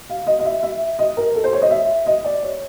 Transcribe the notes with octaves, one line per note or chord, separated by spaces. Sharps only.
F5
D#5
D#5
E5
E5
D#5
A#4
A4
C5
C#5
D#5
E5
D#5
D5
C#5